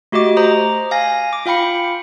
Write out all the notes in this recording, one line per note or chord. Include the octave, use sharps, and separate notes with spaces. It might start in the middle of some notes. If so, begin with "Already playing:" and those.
A3 F#4 G4 D#5 D6
C5 A#5 D6 D#6
F5 G#5 A#6
D6
F4 F5 G5 B5 C#7